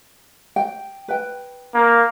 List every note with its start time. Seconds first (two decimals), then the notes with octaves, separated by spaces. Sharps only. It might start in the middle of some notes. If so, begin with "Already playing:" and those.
0.56 G5
1.08 B4 G5
1.74 A#3